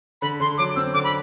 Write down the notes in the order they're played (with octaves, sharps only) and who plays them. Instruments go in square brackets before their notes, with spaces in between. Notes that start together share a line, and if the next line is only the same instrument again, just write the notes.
[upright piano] D3 [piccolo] B5
[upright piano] D3 [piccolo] C6
[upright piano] F#3 [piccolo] D6
[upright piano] C4 [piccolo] E6
[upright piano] D3 [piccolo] D6
[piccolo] B5